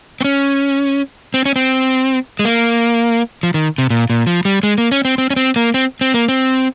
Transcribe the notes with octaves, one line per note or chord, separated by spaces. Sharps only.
C4
C#4
C4
C#4
C4
G#3
A#3
F3
D#3
C3
A#2
A#2
F3
G3
G#3
A#3
C#4
C4
C4
C#4
C4
A#3
C4
C4
A#3
C4